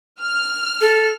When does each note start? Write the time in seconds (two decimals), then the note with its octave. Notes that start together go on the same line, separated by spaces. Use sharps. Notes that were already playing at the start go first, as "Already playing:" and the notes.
0.21 F6
0.81 A4